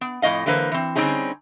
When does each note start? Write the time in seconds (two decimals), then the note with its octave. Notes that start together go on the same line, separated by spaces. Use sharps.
0.01 B3
0.22 F2 A2 A3 D#5 F5
0.46 D3 E3 G#3 A#3 B4 C5
0.72 E3 C4
0.95 D3 G3 C4 C#4 D#4 G#4